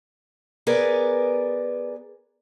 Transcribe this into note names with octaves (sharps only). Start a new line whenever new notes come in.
B3 G#4 A#4 B4 D5